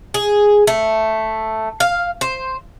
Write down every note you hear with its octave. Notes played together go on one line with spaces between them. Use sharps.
G#4
A3
F5
C5